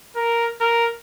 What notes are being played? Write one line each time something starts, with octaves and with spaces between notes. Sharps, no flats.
A#4
A#4